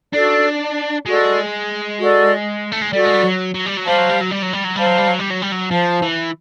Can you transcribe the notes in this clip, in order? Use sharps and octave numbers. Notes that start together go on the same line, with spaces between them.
D4 F#4 A4 D5
G#3 F#4 A4 D5
F#4 A4 D5
A3
G#3
G3 F#4 A4 D5
G#3
G3
F#3
F#3
G3
F#3
G3 C5 F5 A5
F#3
G3
F#3
G3
F#3
G3
F#3
G3 C5 F5 A5
F#3
G3
F#3
G3
F#3
G3
F#3
F3 C5 F5 A5
E3